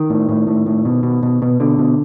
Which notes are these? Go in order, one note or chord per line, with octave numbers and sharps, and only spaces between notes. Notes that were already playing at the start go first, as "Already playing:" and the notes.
Already playing: D#3
A2
A2
A2
A2
B2
B2
B2
B2
B2 D3
B2